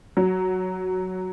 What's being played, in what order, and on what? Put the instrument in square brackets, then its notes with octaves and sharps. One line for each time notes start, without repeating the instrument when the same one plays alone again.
[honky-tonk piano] F#3